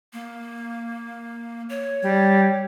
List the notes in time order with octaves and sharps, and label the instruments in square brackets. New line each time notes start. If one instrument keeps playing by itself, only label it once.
[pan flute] A#3
C#5
[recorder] G3